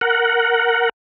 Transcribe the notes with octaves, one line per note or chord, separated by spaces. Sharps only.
A#4 F#5